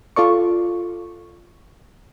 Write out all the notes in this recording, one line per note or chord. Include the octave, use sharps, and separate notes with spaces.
F4 A4 D5 C#6